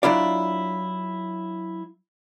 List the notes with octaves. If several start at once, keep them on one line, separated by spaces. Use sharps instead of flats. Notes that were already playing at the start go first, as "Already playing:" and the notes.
F#3 D4 E4 F4 D5